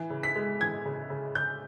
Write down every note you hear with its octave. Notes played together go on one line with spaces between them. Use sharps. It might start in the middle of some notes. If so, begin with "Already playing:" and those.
Already playing: E3
C#3
B6
G#3
E3 G#6
C#3
C#3
C#3 G6